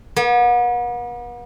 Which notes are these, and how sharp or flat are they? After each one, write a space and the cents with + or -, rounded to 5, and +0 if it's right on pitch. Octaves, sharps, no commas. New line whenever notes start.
B3 -40